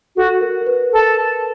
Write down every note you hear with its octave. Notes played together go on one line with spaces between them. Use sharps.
F#4 A4
A#4
A#4
B4
A4